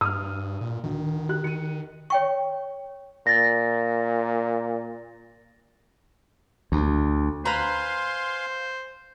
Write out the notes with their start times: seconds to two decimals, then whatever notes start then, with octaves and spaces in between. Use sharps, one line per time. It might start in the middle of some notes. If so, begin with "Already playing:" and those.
0.01 G2 D#6 F6
0.61 A#2
0.84 D2 D#3
1.29 G4 F#6
1.44 D#3 C#7 D#7
2.10 C#5 G5 C#6
3.27 A#2 A6 A#6
6.72 D2
7.45 B4 C5 F5 G#5 A#5 C6